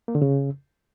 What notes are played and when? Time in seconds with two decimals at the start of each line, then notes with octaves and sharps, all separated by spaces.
0.08 A#3
0.15 D3
0.22 C#3